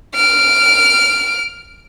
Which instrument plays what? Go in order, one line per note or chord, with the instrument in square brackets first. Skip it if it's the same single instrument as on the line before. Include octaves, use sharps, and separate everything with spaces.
[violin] F6 D7